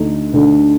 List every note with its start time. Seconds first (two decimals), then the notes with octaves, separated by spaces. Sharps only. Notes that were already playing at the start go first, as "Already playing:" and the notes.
Already playing: D2 D3 A3 D#4
0.33 D2 D3 A3 D#4